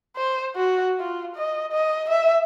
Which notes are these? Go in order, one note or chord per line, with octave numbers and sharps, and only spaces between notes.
C5
F#4
F4
D#5
D#5
E5